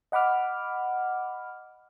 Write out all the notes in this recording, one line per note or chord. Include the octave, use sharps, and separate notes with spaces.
D#5 F#5 B5 D6 F6